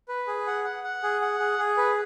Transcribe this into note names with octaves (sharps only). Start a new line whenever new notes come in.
B4
G#4
F#5
F#5
F#5
G#4
F#5
G#4
G#4
B4